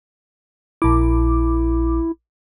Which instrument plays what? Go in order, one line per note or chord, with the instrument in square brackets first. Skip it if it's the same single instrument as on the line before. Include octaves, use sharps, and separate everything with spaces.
[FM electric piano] A#1 D6 [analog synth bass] E4